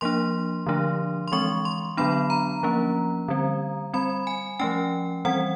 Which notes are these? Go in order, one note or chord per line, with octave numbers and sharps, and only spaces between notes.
F3 A#3 D4 C6
D3 F3 A3 D4
C6
E3 G#3 C4 C#6
C6
D3 F#3 B3 D4 B5
A#5
F3 A#3 C#4
D3 G3 C4
G3 C4 B5
G#5
F3 A3 C#4 G5
E3 G3 C4 F#5